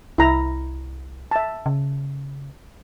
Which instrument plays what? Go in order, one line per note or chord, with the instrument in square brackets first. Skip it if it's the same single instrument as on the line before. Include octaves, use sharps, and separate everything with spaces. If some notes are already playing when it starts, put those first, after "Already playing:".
[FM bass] C2 [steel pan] E4 A#5
[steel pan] E5 A5
[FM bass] C#3